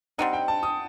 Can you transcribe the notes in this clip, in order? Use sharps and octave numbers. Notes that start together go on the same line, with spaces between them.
G3 C4 D#4 F#5
G5
A5
D#6